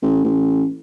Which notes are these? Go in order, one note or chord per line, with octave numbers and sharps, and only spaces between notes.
A1
A1